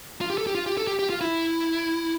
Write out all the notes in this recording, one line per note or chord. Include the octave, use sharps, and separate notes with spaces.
F4
G4
A4
G4
F4
G4
A4
G4
G4
F4
E4